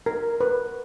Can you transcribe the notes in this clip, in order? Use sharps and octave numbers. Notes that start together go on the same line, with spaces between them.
A#4
B4